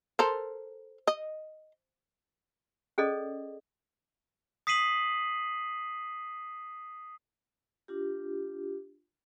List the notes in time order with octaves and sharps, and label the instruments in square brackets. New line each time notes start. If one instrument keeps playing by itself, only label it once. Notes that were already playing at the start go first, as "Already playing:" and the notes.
[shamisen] A4 A#4 C5
D#5
[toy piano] C#4 G#4 A4 D5 D#5
[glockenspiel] D#6 B6 C7 D#7 F#7
[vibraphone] D4 F4 G4